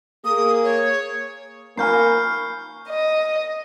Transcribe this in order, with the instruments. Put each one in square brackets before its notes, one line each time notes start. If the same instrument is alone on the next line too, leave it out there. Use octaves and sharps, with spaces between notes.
[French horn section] A#3 G#4 [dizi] D#6
[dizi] C#5
[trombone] A#3 [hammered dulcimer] G#5 B5 C#6 [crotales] F6 G6 C7
[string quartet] D#5